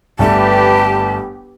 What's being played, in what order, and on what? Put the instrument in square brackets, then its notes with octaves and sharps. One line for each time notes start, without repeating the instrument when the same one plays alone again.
[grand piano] G1 G3 A3 [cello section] G4 B4 [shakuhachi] A5